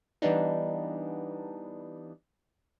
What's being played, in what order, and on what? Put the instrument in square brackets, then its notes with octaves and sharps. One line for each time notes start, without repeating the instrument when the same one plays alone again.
[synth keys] E3 G3 B3 D4 D#4